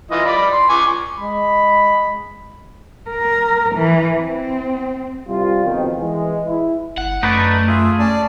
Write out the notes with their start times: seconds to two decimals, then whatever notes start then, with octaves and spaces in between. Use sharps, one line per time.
0.11 E3 F4 D#5
0.25 D5 B5
0.53 C6
0.70 G#5 C#6 D6
1.18 G#3 B5
3.10 A#4
3.75 E3
4.19 C4
5.28 C2 G3 F4
5.64 F2 B2 D#3
5.98 E3 G#3
6.47 E4
6.97 G1 F#5
7.23 F#2 A3 D#4 B4 D5
7.68 F4 G#4 E5
7.99 C#4 D5 A5